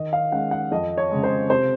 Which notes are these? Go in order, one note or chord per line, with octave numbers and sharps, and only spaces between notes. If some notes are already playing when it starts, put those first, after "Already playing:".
Already playing: D#3 D#5
F5
G#3 C#4 F#5
F#5
F2 D#5
C#5
C#3 G#3
C5
C3 C5